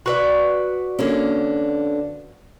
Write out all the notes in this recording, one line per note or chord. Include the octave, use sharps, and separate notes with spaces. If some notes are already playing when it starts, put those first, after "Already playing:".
F#4 B4 D5
D3 A#3 C#4